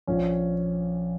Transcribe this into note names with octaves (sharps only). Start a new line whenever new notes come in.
A#1 A#2 C#4